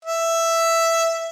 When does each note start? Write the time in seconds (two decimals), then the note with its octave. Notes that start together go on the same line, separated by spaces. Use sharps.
0.05 E5